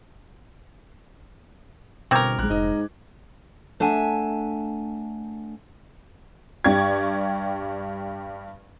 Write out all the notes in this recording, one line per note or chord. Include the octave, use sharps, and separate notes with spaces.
G1 B2 C4 A#4 C#6 D6 G#6
A#1 G#2 F#6
F1 G#2 D#5
A3 D4 E5 F#5 G#5
G2 G4 D5 G5 C#6 G#6